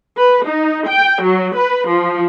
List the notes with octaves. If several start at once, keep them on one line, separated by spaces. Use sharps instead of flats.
B4
D#4
G5
F#3
B4
F3